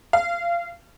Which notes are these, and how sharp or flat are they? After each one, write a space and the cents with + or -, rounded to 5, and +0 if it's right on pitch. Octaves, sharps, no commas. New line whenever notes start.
F5 -25